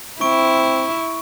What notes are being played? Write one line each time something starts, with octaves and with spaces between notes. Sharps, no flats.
C4 E4 C#6 D7